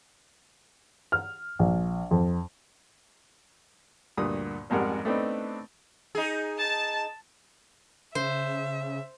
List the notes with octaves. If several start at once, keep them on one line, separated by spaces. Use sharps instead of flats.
F6
A#1
F2
D2 G2 A#2 D#6
A1 F2 G#2 G3 A#4 F#5
A3 B3 C4 D4 D#4
D#4 G#4
A5
C#3 C5 E5